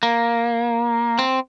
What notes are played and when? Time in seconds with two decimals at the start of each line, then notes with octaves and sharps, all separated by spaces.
0.03 A#3
1.19 C4